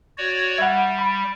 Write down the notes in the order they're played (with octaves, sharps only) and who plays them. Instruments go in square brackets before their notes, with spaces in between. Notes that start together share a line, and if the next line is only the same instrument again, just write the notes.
[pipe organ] F#4 C#5 D5
[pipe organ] G3 [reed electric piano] E5 F#5
[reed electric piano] B5